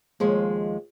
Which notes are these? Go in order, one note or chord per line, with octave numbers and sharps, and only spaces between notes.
D#2 F3 G#3